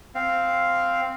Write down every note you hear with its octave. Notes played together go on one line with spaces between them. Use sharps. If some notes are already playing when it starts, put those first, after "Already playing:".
C4 F5